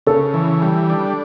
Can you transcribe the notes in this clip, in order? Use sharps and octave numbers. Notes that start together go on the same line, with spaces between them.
C#3 A4
E3
G3
D4